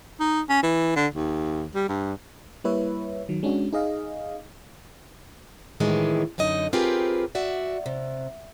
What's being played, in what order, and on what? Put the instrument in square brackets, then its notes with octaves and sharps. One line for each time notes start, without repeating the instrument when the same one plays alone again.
[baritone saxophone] D#4
C#4
E3
D3
D#2
G3
G2
[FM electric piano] G3 A#3 E4 B4 C#5 E5
D#3 F#3
G#3 C#4 D4 F#4
D#4 G#4 D#5 F5
[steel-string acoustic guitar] A2 D#3 E3 G#3 G4
F#2 D3 D#4 D#5
C4 F4 G4 G#4 A#4 B4
F#4 D5 E5
C3